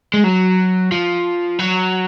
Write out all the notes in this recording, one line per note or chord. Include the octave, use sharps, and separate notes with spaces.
G#3
F#3
F3
F#3